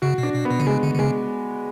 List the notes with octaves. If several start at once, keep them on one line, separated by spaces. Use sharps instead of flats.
C#3 F#4
B2
D4
B2
B3
B2
D3
C#3 G#3
D3
D3
C#3 G#3